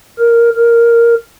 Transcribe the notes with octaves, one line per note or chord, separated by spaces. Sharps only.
A#4
A#4